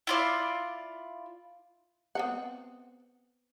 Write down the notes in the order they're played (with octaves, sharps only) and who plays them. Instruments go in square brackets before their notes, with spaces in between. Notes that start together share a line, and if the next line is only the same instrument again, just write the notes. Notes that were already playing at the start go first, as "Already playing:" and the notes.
[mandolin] E4 F4 D5
[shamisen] B3 C4 F#5